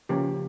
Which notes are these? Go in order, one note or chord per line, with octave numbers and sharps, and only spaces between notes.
C#3 F3 A#3 C#4 G4